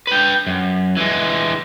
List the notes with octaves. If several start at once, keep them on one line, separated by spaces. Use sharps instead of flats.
B4 G5
F#2
E3 G#3